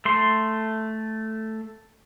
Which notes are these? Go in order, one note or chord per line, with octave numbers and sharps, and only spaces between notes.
A3 C6